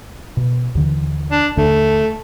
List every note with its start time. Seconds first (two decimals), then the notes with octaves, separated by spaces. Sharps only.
0.37 B2
0.75 D#2 D3 E3
1.32 D4
1.57 D#2 D3 A3 D4